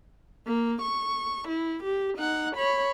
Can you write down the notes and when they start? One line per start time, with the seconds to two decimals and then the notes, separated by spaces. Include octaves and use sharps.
0.47 A#3
0.82 C#6
1.49 E4
1.84 G4
2.18 D#4 F#5
2.56 C#5 B5